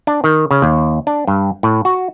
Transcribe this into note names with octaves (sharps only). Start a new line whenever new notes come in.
D4
D#3
C#3
D#2
D4
G2
A2
F#4